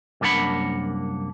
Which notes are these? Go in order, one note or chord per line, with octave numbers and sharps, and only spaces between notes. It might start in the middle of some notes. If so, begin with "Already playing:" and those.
C2 F#2 A#3 D4 F#5 B5